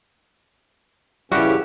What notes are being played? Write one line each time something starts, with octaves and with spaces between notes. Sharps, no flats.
A#2 C#3 E3 G3 C#4 E4 F#4 G4